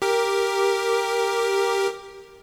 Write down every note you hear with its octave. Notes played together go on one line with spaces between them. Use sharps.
G4 A#4